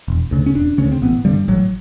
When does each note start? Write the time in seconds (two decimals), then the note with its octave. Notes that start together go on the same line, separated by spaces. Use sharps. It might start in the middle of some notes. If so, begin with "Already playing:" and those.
0.08 E1
0.31 D2 C#3
0.46 C#4
0.55 E1 D4
0.78 D2 C#3 C#4
0.92 C4
1.02 A1 B3
1.25 G2 D3 G3
1.48 A1 F#3